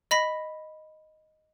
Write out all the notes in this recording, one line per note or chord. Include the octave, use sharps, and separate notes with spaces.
D#5 B5 A#6 B6